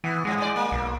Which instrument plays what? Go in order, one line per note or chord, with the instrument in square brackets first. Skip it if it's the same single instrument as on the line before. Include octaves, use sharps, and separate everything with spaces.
[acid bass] E3 [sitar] B3
[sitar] F2 G#2 [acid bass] G#3
[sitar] G#2 D5
A#3
[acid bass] B1